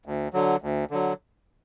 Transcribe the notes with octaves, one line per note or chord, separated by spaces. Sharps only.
D2
D3 F#3
D2
D3 F#3